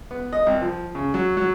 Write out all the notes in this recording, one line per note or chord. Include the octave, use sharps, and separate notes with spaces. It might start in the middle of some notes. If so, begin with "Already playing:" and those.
B3
D#5
C2
F3
C#3
F#3
F#3